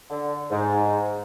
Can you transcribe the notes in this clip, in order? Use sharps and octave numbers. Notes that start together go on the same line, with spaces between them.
D3
G#2